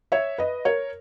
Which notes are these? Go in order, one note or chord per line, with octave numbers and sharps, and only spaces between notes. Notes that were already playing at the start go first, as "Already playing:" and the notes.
C#5 E5
B4 D#5
A#4 C#5